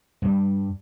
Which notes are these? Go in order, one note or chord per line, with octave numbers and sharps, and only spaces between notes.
G2 G3